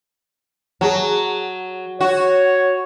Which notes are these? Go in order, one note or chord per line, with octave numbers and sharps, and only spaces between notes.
F#3 G#4 A5
F#4 C#5